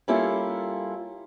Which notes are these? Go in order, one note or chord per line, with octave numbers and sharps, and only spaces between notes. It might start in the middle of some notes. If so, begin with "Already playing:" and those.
G3 A#3 C#4 E4 F4 A4